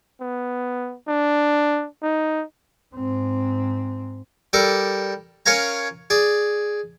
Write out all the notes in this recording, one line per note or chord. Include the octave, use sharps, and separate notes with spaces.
B3
D4
D#4
G#2 C4
G3 A4 A#4 D5
C#4 A#4 C#5 F5 G#5 A#5
G#4 D5